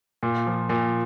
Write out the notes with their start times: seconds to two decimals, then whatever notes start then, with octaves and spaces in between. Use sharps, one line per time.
0.23 A#2
0.47 F3
0.69 A#2